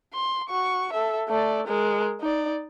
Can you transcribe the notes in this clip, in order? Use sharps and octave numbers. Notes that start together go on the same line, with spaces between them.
C6
F#4 C#6
A4 E5
A3 D5
G#3 A#4
D#4 D5